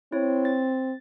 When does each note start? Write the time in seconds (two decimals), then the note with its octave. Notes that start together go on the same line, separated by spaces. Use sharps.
0.12 C4 E4 C#5
0.45 A6